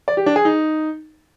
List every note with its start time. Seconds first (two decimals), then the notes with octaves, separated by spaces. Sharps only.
0.08 D5
0.17 G4
0.26 D4
0.36 G#4
0.45 D#4